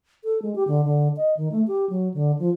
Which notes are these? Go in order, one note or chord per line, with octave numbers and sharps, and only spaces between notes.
A4
G#3
G4
D3
D3
D#5
D#3
A3
G4
F#3
D3
F3